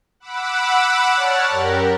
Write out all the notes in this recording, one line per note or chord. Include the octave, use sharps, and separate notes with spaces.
F#5 B5 D6 E6
C#5 D5 F#5 A5 F6
F#2 G4 A#4